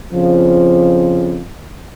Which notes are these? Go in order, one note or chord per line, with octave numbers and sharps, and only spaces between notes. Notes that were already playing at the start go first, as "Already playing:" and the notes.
F2 C#3 F3